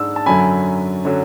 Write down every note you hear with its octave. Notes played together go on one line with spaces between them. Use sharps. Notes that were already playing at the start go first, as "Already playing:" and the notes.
Already playing: G#2 G#3 D4 E6
A5
F#2 D3 F#3 C#4 G#5 B5
D3 F#3 C#4